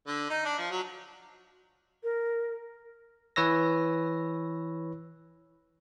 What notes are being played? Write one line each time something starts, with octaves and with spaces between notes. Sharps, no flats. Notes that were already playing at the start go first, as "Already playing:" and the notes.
D3
D#4
D4
F3
F#3
A#4
E3 B4 C#5 E6 A#6